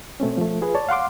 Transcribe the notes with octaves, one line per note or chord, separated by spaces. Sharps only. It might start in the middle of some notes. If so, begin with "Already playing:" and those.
B2 A3 C4 C#4
F3 A3
F4 G#4 B4
C#5 D5 A5
F5 F#5 C6 D6